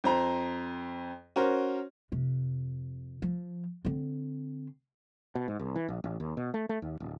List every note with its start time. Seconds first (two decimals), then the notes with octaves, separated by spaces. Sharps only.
0.04 F2 C5 A#5
1.36 C#4 F#4 A#4 C5
2.12 F2 C3
3.22 F3
3.85 D3 C4
5.35 B2
5.48 G#2
5.59 C2
5.76 E3
5.88 A#1
6.04 A1
6.20 D#2
6.37 B2
6.54 A3
6.69 A3
6.82 D#2
7.00 D1